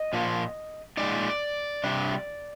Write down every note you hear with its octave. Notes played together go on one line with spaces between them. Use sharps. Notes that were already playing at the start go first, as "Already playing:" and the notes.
Already playing: D#5
A#2 F3 A#3
A#2 G#3 D#4 D5
C3 G3 D4